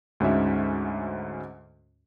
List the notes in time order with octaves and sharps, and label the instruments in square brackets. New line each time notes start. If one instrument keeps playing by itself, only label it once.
[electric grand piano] D2 G#2 C#4 F#4 E5